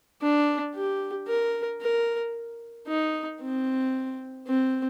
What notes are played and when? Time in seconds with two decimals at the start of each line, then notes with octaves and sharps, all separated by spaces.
0.22 D4
0.75 G4
1.28 A#4
1.81 A#4
2.88 D#4
3.41 C4
4.47 C4